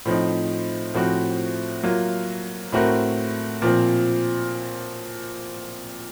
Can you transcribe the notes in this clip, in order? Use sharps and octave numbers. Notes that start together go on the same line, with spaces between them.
A2 F3 C4 D#4
A2 F3 C4 F#4
F#3 A#3 F4
A2 A3 C4 F#4 A#4
A#2 F3 C4